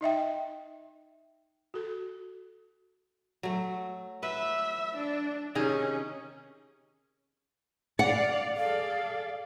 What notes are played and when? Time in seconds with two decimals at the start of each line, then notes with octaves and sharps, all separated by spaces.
0.01 D#4 D#5 E5 G5
1.74 F#4 A4
3.43 F#3 A3
4.23 B4 E5
4.97 D4
5.55 C3 D#3 C#4 G#4
7.99 D5 F5 F#5
8.56 G#4 A4 D5 F5